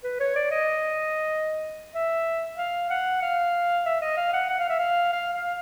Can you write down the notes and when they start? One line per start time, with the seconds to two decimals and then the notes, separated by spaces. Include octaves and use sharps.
0.04 B4
0.20 C#5
0.35 D5
0.51 D#5
1.94 E5
2.57 F5
2.90 F#5
3.22 F5
3.86 E5
4.01 D#5
4.17 F5
4.33 F#5
4.49 F#5
4.59 F5
4.69 E5
4.79 F5
5.13 F5
5.34 F5